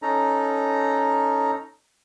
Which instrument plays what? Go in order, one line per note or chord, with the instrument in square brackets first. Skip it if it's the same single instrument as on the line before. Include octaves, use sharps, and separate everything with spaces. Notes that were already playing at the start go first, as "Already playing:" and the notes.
[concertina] C#4 D#4 A4 A#5